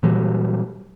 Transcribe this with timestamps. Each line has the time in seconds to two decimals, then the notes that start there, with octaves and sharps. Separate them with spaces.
0.03 A#2 E3 F#3 G3